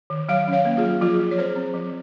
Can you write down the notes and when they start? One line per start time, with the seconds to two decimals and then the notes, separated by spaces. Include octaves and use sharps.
0.10 D#3
0.29 F#3 C#5 F5
0.47 C#4
0.52 C#5 F5
0.65 A#3
0.77 F4 G#4
0.84 F#3
1.01 F3 F4 G#4
1.20 F3
1.31 C#5
1.38 C4 G#4 C5
1.56 C4
1.74 F3